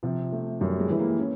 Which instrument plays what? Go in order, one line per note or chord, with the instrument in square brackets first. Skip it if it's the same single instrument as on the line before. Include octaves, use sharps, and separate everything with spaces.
[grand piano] C3 [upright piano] F3
[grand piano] A3
[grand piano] F#2 [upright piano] G3
[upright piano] G#3
[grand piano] E3
[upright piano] A#3
C#4